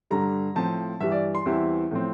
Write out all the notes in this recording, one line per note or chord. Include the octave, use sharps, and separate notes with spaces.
G2 D3 G3 A#5
A2 F3 C4 A5
G2 E3 G3 E5
D5
C6
E2 E3 G3 C4 E4
A2 F3 C4